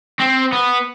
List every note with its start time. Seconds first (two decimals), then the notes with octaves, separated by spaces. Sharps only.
0.19 C4
0.53 B3